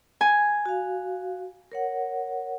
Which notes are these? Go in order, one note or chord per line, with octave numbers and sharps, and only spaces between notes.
G#5
F#4 F5
A#4 C#5 F#5